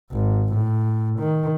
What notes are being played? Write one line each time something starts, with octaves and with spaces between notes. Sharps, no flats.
G#1
A2
D#3